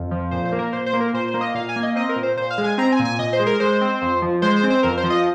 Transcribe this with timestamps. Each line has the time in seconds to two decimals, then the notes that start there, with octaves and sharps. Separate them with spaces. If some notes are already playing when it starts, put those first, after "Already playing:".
Already playing: F2
0.11 F3
0.31 A#2 C5
0.45 C5
0.52 A#3
0.59 A#4
0.73 A#2 C5
0.86 C5
0.93 A#3
1.00 A#4
1.14 A#2 C5
1.28 C5
1.34 A#3
1.41 D#5
1.54 A#2 F5
1.69 G#5
1.76 A#3
1.83 D#5
1.96 C4 D#5
2.09 A#4
2.16 A#2
2.23 C5
2.37 A#2 C5
2.50 F5
2.58 G#3
2.64 G#5
2.78 C4 A#5
2.92 G#5
2.99 A#2
3.05 G#5
3.19 A#2 D#5
3.33 C5
3.39 G#3
3.46 A#4
3.60 G#3 C5
3.81 C4
4.02 F2
4.22 F3
4.42 G#3 C5
4.56 C5
4.63 C4
4.70 C5
4.83 F2 A#4
4.97 C5
5.03 F3
5.10 D#5